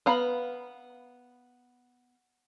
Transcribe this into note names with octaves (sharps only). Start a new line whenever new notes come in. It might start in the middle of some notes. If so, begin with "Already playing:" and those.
B3 F5 A#5 B5